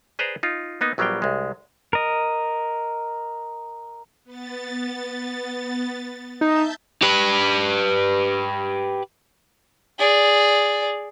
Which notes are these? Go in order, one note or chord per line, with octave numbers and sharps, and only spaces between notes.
G#4 B4 C5 D5 A#5
D#4 F4
A#3 B3 D#4
A#1 F#3 G3 B3 F5 G5
C2 G#3
A#4 D#5
B3 A6
D#4 E5 A5 G6
G4 B4
G#4 D5